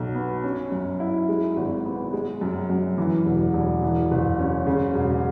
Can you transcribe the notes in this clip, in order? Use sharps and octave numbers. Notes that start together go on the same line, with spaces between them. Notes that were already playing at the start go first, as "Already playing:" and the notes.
Already playing: B1 F#3
B3
C#4
F#2
E4
G#3
G#1
B3
G#3
F#2
F#2
E3
E1
E1
E3
F#1
C#4
C#3
E1